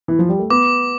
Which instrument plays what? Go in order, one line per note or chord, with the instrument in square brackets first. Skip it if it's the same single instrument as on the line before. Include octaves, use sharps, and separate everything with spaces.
[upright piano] E3
F3
G3
A3
[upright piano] B3 [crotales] D6